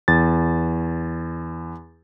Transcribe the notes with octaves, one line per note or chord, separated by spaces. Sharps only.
E2 A6